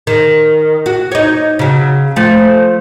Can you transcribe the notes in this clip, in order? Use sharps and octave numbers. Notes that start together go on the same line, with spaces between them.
D#3
F#4
D#4 C#5
C#3 F#3
F3 A3